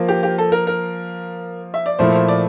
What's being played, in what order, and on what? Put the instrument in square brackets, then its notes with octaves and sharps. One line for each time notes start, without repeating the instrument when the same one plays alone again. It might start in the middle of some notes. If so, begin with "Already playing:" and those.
Already playing: [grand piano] F3 A#3 F4
[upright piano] G4
G4
A4
A#4
A#4
E5
D5
[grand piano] A#2 F3 A3 E4 [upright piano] C5
[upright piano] C5
D5